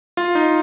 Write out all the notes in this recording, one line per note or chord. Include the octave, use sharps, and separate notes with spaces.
F4
D#4